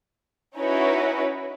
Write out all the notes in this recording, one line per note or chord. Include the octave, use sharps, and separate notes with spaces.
C#4 D#4 E4 F#4 B4 C#5